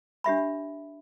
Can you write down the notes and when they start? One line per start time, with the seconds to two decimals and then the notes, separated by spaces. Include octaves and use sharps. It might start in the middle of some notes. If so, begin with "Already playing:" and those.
0.24 D4 G4 E5 B5